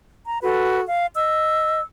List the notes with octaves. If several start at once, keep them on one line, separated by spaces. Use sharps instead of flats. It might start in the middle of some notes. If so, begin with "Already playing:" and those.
A#5
F#4 A4 B4
F5
D#5 E6